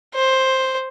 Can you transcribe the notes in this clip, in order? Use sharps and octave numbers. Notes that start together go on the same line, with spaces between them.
C5